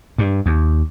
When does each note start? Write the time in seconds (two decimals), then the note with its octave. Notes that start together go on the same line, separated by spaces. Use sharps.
0.18 G2
0.46 D#2